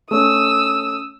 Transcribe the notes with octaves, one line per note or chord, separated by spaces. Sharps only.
A3 C#4 D#6 E6